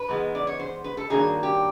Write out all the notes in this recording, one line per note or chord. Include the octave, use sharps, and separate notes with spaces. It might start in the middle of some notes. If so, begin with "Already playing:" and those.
Already playing: B4
G#2 E3 G#3 B3
D5
C#5
C5
B4
A4
G2 D#3 F#3 A#3 D4 G#4
G4